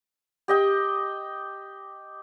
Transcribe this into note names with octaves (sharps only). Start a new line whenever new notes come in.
G4 D#5 G5